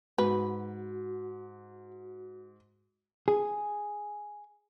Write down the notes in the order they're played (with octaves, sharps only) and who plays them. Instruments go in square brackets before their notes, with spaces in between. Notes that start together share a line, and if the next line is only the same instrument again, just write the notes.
[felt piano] G#2 [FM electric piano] F#4 [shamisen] B4
[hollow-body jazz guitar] G#4